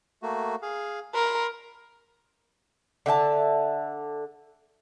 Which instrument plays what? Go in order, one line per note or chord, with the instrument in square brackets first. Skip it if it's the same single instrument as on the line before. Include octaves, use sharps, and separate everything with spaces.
[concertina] A3 A#3 F#4
G#4 F5
[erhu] A#4 [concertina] B5 C6
[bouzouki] D3 E5 G5 A5